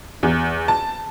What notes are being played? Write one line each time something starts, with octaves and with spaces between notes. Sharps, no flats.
E2
A5